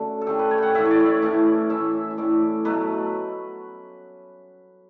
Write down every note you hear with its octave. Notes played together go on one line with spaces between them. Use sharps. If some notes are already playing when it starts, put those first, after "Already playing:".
Already playing: D3 A3 C#4 F#4
A4
D3 A3 C#4 G4
B4
C#5
F#5 G5
A2 E3 A3 C#4 E5
C#5
D5
C#5
D5
A2 E3 A3 C#4
A2 E3 A3 C#4 E5
E5
A2 E3 A3 C#4 D5
B2 F#3 A3 B4